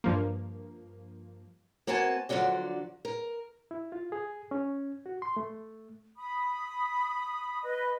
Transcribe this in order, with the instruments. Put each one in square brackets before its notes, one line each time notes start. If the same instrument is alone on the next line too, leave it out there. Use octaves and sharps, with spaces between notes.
[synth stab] G2 F3 A#3
[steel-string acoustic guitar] A#3 C4 F#4 G#5 A5
D3 F3 F#3 C#4 F#4 D5
A#4
[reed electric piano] E4
F4
G#4
C#4
F#4
C6
A3
[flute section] B5 D#6
B4 D#5